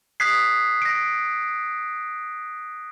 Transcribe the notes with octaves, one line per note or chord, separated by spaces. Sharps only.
D#6 F#6 G#6 B6 C7
A#6 D7